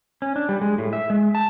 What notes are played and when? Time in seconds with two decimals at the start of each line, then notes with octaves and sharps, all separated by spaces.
0.22 C#4
0.36 D4
0.49 G3
0.61 G#3
0.78 A2
0.93 E5
1.10 G#3
1.35 A5